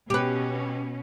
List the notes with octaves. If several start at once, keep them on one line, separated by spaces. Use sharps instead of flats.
B2 C#4 G4 B4